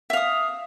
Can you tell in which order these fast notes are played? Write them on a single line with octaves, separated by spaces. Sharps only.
E5 F5 D#6